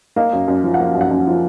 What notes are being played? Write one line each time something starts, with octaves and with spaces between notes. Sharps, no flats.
A#3 D#5
F#2
F#2
F3
F#5
A#3 F5
F#2
F#5
F#2
F3